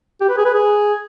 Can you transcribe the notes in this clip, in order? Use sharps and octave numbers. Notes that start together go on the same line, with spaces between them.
G4
B4
G#4
B4
G#4